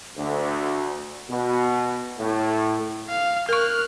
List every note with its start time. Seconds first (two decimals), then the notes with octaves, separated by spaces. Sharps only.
0.17 D2
1.30 B2
2.18 A2
3.09 F5
3.49 A#4 C#6 F6 F#6